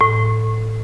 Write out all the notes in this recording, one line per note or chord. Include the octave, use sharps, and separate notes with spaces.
A2